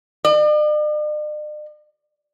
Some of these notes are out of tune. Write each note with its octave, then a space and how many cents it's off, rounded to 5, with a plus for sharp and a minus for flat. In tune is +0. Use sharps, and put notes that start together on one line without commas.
D5 +45